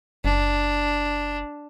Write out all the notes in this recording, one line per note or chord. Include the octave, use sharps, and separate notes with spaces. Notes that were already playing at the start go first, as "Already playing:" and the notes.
F#1 D4